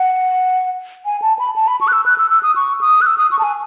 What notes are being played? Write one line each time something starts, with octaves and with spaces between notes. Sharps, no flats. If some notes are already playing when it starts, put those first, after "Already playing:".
Already playing: F#5
G#5
A5
B5
A5
B5
C#6
F#6
E6
F#6
E6
E6
D#6
C#6
D#6
F#6
E6
D#6
C#6
A5
G#5